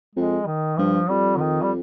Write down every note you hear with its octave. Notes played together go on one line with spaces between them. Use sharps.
F2 G#3
D#3
G2 F3
F2 G3
D3
D#3
G3